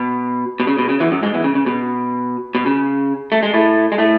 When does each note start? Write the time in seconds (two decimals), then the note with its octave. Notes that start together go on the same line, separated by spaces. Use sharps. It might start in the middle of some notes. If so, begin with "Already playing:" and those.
Already playing: B2
0.60 B2
0.67 C#3
0.78 B2
0.89 C#3
1.00 E2 E3
1.11 F#2 F#3
1.22 G#2 G#3
1.34 E2 E3
1.44 C#3
1.55 C#3
1.66 B2
2.55 B2
2.66 C#3
3.32 A3
3.43 G#3
3.54 A2 A3
3.92 G#3
3.98 A2 A3